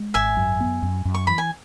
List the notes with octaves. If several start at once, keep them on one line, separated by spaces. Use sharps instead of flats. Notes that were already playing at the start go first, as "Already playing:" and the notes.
Already playing: G#3
G#1 E5 G#5
F#2
B3
F#2
F#2
C#6
E3 B5
G#5